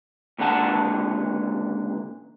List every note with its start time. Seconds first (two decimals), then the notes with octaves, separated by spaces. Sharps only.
0.38 C#2 A#2 D3 F#5 A5